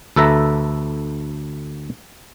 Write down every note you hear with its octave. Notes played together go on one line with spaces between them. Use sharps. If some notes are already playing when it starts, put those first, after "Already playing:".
D2 A4 B4 E5 A#5